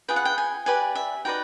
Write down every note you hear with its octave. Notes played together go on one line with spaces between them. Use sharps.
F4 G#4 B4 G5
F#5
G5
G#5
G4 B4 D5 G#5
E5
D#4 F#4 B4 D5 G5